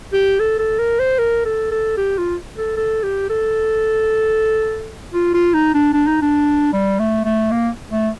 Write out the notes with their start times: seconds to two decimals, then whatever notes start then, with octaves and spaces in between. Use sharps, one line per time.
0.13 G4
0.40 A4
0.59 A4
0.79 A#4
0.99 C5
1.19 A#4
1.45 A4
1.71 A4
1.97 G4
2.18 F4
2.57 A4
2.77 A4
3.03 G4
3.30 A4
5.14 F4
5.34 F4
5.54 D#4
5.74 D4
5.93 D4
6.07 D#4
6.22 D4
6.73 G3
6.99 A3
7.25 A3
7.51 A#3
7.91 A3